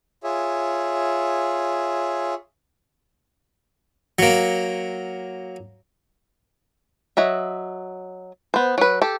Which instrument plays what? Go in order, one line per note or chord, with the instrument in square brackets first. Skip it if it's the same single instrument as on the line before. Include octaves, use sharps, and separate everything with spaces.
[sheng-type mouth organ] F4 G#4 C#5 E5
[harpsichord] F#3 A#3
[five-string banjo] F#3 D#5 E5
B3 C5
F#3 B4
G4 A4